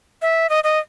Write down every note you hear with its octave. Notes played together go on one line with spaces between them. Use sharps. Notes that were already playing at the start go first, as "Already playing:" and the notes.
E5
D#5
D#5